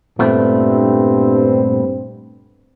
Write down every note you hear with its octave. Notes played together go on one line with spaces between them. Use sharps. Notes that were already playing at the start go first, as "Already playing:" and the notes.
G2 A#2 A3 B3 C4